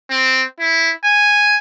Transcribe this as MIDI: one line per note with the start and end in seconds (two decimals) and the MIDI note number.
0.10 0.43 60
0.60 0.92 64
1.04 1.57 80